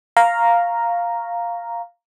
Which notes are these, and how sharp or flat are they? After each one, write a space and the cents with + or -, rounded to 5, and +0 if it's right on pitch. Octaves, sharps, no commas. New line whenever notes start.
F5 +0 A#5 +0 C#6 -5